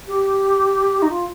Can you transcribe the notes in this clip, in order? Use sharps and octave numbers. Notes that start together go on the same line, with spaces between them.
G4
D#4
F4